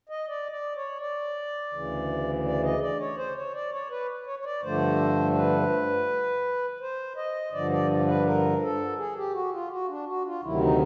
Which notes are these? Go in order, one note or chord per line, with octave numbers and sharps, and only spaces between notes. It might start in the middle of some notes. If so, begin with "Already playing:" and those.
D#5
D5
D5
C#5
D5
D2 C#3 E3
D5
D#5
D5
C#5
C5
C#5
D5
C#5
B4
C#5
C#5
D5
G2 D3 F3 A3 C5
B4
C5
D#5
G2 D3 F3 D5
D5
B4
A#4
A4
G#4
G4
F#4
F4
F#4
D4
F#4
F4
D2 C3 D#3 F#3 E4
D#4